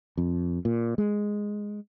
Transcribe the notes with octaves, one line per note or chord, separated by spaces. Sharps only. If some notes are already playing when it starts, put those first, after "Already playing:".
F2
A#2
G#3